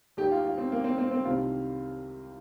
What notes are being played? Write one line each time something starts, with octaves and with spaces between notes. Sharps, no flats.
D#2 D#3 G4
F4
F4
C4
A#3
C4
C4
C4
C2 C3 D#3 F4